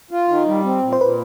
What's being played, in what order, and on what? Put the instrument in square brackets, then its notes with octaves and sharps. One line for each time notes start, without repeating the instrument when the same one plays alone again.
[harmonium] F4
D#3
G3
C4
A#2
[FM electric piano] C5
[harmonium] A#2 [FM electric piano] B4